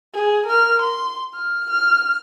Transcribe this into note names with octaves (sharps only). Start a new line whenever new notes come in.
G#4
A#4 F6
C6
F6
F6